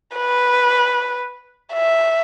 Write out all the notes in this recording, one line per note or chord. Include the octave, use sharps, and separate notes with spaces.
B4
E5